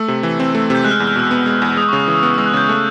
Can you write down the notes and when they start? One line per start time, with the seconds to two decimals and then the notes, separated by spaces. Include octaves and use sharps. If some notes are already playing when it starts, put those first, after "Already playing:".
Already playing: A3 E6
0.08 C3
0.23 E3
0.40 C4
0.55 A3
0.70 C3 G6
0.84 G#3 F#6
0.91 F6
0.96 E2 F#6
1.07 F6
1.16 B2 E6
1.31 B3
1.46 G#3
1.62 E2
1.77 G#3 D#6
1.89 C#3 C#6
2.08 E3 E6
2.22 B3 E6
2.34 G#3 E6
2.46 F#6
2.53 C#3 G6
2.69 A3